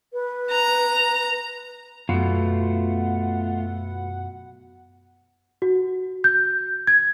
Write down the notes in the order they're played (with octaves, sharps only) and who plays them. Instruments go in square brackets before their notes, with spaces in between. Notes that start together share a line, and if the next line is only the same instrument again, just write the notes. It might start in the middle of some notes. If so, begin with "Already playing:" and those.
[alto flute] B4
[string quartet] A#5
[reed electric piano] F#2 [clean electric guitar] B2 [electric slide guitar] A3 F4 [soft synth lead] F#5
[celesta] F#4
G6
G#6